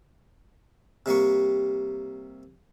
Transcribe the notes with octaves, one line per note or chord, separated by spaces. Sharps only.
C3 G3 A#3 C#6